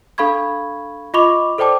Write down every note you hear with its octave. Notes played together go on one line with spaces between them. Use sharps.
D4 A4 F5 B5 C#6 G#6
F4 D#5 B5 C#6 D6 F7
A4 C5 D5 G5 A5 D6